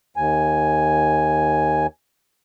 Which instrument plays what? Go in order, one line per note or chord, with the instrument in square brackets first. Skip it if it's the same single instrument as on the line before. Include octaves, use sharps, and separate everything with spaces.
[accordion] D#2 G#5